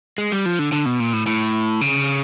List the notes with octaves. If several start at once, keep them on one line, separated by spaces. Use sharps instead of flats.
G#3
G3
F3
D3
D3
B2
A#2
A2
A2
C#3